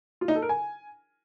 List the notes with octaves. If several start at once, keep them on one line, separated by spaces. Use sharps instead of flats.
F4
D#4
A4
A#4
G#5